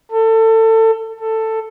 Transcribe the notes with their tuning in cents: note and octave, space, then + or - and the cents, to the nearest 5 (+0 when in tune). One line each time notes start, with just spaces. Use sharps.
A4 +25
A4 +10